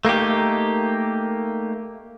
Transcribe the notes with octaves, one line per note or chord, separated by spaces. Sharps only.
A3 A#3 D#4 G4